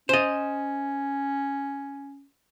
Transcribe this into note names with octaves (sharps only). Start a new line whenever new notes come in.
C#4 C5 D#5